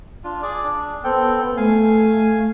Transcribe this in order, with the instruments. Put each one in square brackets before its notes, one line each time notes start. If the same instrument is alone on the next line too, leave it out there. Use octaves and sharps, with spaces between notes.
[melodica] D4 F4
G#4 D5
D4
[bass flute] B3 [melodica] C4 A4 G5
[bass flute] A3 [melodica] F5 G#5